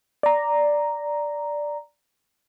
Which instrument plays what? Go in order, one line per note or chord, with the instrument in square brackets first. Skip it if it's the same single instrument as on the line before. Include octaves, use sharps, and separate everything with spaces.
[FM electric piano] D5 A#5